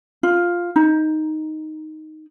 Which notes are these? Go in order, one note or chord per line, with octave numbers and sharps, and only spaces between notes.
F4
D#4